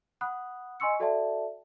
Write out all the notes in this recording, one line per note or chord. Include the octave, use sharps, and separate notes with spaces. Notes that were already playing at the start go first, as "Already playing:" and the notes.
F#5 B5 D#6 F#6
D#5 G#5 C6 C#6 E6 C#7
F#4 A4 D5 E5 G5 A5